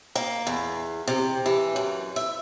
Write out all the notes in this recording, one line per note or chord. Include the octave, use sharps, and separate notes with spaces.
A#3
E2
C3
E3
F#2
E5